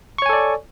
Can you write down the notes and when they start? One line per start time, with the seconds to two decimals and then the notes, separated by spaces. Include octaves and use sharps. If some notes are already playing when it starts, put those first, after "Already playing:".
0.18 C#6
0.22 C#5
0.26 G#5
0.29 A4
0.33 D5